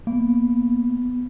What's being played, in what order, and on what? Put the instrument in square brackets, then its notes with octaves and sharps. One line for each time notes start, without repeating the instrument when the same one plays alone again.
[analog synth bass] A#3 [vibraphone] B3